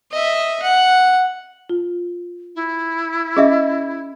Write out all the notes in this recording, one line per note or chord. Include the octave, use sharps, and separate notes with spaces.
D#5 E5
F#5
F4
E4
C#4 G#4 D#5 E5